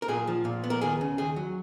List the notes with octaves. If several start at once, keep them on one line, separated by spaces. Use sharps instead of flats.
A#4
A#2 G#4
F3
A#2
B3
A#4
D#2 G#4
C#3
D#2 G#4
F#3